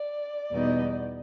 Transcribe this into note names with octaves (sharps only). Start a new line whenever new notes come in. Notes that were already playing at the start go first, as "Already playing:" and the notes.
Already playing: D5
E2 B2 G3 B3 D#4